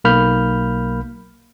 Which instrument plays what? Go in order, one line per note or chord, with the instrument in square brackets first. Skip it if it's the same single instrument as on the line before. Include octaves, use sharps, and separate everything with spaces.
[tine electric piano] B1 A#3 B5 F6 G6